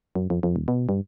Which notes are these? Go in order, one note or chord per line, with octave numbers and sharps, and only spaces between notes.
F#2
F2
F2
D#1
B2
G2